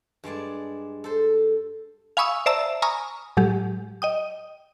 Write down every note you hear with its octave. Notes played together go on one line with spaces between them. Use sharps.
G2 G#3 D5 A5
A4 C5
F5 G#5 B5 C#6 D#6 E6
C5 D5 E5 A5 A#5 E6
G#5 A#5 B5 C#6 D#6 F6
A2 F#3 G#3 G4
D#5 G5 D#6